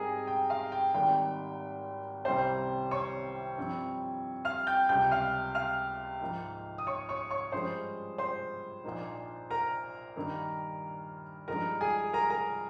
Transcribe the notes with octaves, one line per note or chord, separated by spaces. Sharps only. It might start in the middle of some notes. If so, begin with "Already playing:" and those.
Already playing: G#2 G3 C4 D#4 G#4 A#4 G#5 A#5
G5
F5
G5
G#1 G#2 D#3 G3 A#3 G5
C2 C3 G3 A#3 C#4 C5 C6
C#5 C#6
G2 F3 C4
F5 F6
G5 G6
C#2 C3 G3 G5 G6
F5 F6
F5 F6
G#2 F3 A#3 D#4
D#6
C#5 C#6
C#5 C#6
C#5 C#6
G2 F3 G#3 C#4 C5 C6
C5 C6
A#1 A#2 F3 A#3 D#4
A#4 A#5
G2 D#3 A#3 D#4
G2 F3 G#3 D#4 A#4 A#5
G#4 G#5
A#4 A#5
A#4 A#5